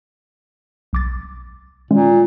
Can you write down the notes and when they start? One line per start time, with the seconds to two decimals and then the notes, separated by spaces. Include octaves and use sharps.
0.93 B1 D6 A6
1.91 A#2 D#3 G#3 C#4